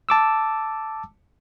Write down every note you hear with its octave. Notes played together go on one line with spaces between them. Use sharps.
A5 D6 E6